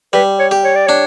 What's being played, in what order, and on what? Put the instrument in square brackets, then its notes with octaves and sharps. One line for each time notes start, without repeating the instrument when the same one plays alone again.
[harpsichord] G3 [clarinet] B4
[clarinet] C#5
[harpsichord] G4
[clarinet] C#5
D5
[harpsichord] D4 [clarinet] C#5